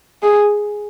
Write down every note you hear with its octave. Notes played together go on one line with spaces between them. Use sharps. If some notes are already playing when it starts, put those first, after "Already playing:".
G#4